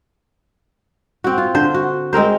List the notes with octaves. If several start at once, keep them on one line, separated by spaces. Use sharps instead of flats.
C4 F#4
F4
D3 C5
F#4
G#3 C4 A#4 C5